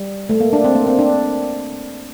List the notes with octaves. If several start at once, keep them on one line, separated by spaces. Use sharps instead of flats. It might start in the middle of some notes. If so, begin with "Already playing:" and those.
Already playing: G3
A3
A#3
D4
C4
A#3
C4
D4